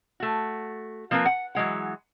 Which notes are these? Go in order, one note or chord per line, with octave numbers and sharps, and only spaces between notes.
A3 F#4
F3 A#3 C4 A#4 B4
F#5
E3 F#3 G#3 F#5